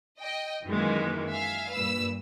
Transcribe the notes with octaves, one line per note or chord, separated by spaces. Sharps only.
D#5 G5
F#2 D#3 E3 G#3 A#3
E5 F5 G#5
G2 A#2 B4 E6